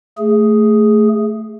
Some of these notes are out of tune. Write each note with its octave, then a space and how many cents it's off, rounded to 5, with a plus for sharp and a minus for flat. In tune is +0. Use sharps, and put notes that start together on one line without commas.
A3 +5 G#4 +0